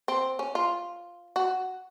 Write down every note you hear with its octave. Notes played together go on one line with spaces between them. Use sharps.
C4
C#4
F4
F#4